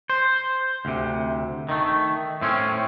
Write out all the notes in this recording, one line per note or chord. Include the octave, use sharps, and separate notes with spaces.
C5
D2 C3
D#3 A3
A2 C4 C#4